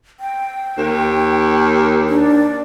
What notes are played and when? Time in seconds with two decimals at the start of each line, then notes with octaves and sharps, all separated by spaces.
0.20 G5
0.78 D#2
2.09 D4